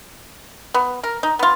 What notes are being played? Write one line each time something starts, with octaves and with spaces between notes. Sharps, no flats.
B3
A#4
D#4
B3 F4